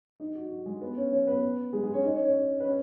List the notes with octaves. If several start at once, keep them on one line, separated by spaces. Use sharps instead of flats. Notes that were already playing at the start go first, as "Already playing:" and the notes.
D#4
F#4
F#4
G#3 G#4
B3 B4
C#4 C#5
C#4 C#5
B3 B4
G#3 G#4
G#3 G#4
C#4 C#5
D#4 D#5
C#4 C#5
C#4 C#5
B4
C#4 C#5